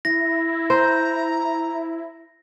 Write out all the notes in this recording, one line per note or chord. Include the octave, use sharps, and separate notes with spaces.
E4 A#6
C5 A#5